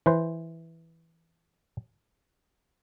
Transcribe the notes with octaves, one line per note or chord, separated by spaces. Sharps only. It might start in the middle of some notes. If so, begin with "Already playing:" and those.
E3 B4 C5